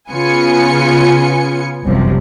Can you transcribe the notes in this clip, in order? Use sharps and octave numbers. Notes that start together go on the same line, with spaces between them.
C#3 B3 F4 G#5 C#7
G1 C2 F#2 C3 F3